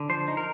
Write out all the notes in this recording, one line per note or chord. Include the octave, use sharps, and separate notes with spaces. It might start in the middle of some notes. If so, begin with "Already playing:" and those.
Already playing: D3
F3 C5
D#4
A#4